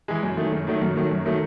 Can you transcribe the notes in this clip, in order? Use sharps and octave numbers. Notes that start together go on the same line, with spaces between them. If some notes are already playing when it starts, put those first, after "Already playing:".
E3 G#3
F#2
D#3 F#3 A3
F#2
D#3 F#3 A3
F#2
D#3 F#3 A3
F#2
D#3 F#3 A3